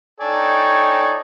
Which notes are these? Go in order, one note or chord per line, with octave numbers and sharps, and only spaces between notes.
D#4 A4 C#5 D5 G5 G#5